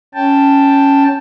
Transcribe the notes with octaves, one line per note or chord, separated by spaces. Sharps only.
C#4 G5 A5